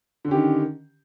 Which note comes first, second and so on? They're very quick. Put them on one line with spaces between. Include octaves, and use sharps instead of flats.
D3 C#4 G4 D#3